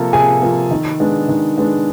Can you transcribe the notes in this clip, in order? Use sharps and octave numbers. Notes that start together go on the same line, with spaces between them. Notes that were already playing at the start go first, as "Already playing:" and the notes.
Already playing: C3 F3 A#3 A4
C3 G#4 G#5
F3 A#3
D#3
G#3 B3 D4
D#3
G#3 B3 D4